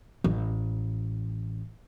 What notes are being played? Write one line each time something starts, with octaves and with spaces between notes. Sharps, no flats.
A1 G#3